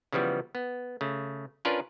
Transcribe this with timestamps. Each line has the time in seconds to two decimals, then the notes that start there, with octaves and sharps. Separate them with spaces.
0.12 C#3 E3 F3 G3 B3
0.55 B3
1.01 C#3 A3
1.65 C#4 D4 F4 A#4 B4 D5